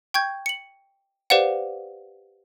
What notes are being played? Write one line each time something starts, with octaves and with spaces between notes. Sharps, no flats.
G5 C#6 G6 G#6
C#7 F#7
G4 B4 C5 D5 F5 F#5